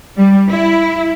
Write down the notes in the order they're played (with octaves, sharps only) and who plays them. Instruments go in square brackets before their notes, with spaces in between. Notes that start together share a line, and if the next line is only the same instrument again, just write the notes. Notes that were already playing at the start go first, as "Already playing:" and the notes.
[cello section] G3
E4